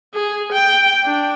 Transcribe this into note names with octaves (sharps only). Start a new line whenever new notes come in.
G#4
G5
D4